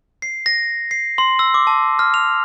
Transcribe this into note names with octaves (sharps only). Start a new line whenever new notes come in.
C7
A#6
C7
C6
E6
D6
A5
F6
F7